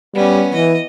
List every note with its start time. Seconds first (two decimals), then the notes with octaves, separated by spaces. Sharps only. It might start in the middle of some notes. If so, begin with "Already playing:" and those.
0.15 G3 B3 C#4
0.54 E3 D#5